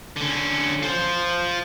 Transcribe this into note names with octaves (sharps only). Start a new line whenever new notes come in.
D3 C#4
F4 C5